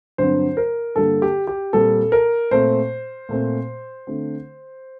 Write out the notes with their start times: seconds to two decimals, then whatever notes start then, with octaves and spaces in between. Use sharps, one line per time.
0.18 G2 D3 F#3 C4 C5
0.57 A#4
0.96 G2 D3 G3 A#3 A4
1.22 G4
1.47 G4
1.73 A#2 G3 C4 A4
2.12 A#4
2.51 A#2 A3 C4 C5
3.29 A#2 A3 C4
4.07 D3 A3 C4